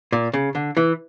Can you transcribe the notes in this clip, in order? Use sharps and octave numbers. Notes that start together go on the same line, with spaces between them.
A#2
C#3
D3
E3